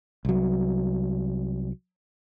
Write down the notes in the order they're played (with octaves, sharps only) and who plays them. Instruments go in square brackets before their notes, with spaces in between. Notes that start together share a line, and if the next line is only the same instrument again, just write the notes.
[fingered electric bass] C2 F#3